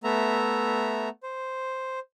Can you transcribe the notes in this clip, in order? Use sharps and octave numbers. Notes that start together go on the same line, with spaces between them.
A3 B3 E5 A#5
C5